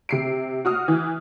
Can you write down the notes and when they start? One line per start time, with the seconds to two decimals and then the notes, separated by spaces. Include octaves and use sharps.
0.09 C3 C7 D7
0.65 F#4 D#6 F6
0.88 E3